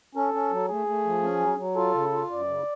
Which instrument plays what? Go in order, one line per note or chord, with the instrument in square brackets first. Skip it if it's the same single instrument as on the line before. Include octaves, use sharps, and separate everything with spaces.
[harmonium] C#4 [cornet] A4
[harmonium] C#4
F#3
[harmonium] A3 [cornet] G#4
[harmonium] A3
F3
C#4
F#3
F#3
[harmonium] F4 [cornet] A4
[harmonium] C#3
F4
[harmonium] F#2 [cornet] D5
[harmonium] C#3